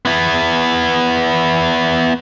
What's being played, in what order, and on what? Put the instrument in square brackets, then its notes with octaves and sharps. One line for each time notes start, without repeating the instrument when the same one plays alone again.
[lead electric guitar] B3 E4